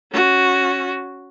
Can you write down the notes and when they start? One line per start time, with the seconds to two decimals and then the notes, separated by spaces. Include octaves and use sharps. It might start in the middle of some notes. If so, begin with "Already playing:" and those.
0.12 C#4 F#4